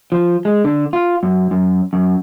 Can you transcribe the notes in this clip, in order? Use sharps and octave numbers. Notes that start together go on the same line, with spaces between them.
F3
G#3
D3
F4
F#2
F#2
F#2